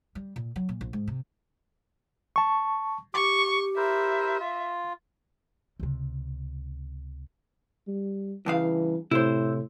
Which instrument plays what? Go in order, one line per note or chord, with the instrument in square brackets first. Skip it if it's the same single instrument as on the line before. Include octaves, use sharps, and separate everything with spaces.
[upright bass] G3
A#2
F#3
A#2
A#1
G#2
C3
[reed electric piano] A5 C#6
[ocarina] G4 [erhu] C#6 [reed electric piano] D6
[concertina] E4 A#4 C5 [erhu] E5
[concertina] F4
[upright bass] C#2 C3
[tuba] G3
[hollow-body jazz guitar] G2 C#3 F5 [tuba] E3
[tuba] A2 [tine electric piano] C3 [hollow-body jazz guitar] E4 C5